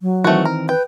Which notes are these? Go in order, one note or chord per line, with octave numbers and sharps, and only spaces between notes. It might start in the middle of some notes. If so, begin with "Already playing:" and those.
F#3
D#3 E3 A3 C4 F#4
A#4
B4 G5